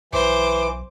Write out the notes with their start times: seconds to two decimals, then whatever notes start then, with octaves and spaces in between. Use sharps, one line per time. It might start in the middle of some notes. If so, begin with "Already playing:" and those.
0.13 B1 E3 C5 D6